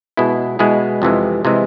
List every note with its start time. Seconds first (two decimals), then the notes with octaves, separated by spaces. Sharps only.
0.17 B2 G#3 B3 E4 G#4
0.59 B2 G#3 B3 E4 G#4
1.02 F2 C3 E3 G#3
1.45 C3 E3 G#3